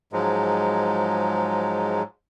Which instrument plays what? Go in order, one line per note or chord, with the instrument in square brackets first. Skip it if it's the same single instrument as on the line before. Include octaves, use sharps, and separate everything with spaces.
[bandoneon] G#2 F3 F#3 G#3